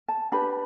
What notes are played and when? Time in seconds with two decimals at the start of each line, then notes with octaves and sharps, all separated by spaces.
0.08 A5
0.32 D4 G4 B4 B5